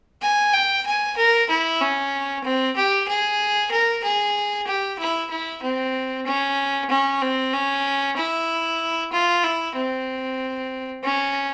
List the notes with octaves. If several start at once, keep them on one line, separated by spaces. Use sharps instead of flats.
G#5
G5
G#5
A#4
E4
C#4
C4
G4
G#4
A#4
G#4
G4
E4
E4
C4
C#4
C#4
C4
C#4
E4
F4
E4
C4
C#4